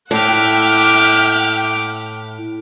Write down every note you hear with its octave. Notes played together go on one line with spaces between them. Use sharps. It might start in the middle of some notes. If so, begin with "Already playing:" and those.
A2 E5 F#5 G5 D6 F6